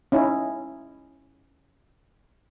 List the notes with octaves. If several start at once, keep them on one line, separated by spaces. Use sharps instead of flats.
C#4 D#4 E4